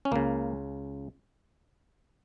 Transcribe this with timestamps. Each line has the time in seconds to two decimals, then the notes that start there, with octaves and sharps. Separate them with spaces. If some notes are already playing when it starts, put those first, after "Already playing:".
0.05 C#4
0.12 C#2 C#3 A#3